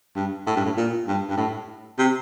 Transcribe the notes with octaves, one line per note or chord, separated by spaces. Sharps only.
G2
A2
G2
A2
A#2
G2
G2
A2
C3